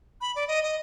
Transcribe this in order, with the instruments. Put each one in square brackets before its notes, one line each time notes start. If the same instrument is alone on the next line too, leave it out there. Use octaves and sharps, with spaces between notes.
[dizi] B5
D5
D#5
D#5